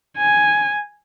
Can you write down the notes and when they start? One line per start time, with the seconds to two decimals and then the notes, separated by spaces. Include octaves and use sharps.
0.17 G#5